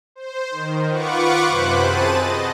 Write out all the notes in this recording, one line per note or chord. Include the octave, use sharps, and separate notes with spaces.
C5
D#3
F4 B4 F#5 C#6 D6
F#2 C3 C5 B5 F#6
C4 G#4 A5 A6 D#7
D#5